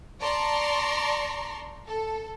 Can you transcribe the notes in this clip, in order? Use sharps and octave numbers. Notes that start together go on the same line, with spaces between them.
D5 A5 A#5 C6 C#6
A4